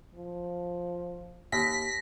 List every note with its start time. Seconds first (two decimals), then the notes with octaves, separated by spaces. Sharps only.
0.15 F3
1.52 D#2 A#6 B6